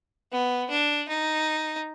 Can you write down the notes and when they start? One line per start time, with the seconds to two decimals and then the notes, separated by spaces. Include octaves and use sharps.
0.32 B3
0.70 D4
1.09 D#4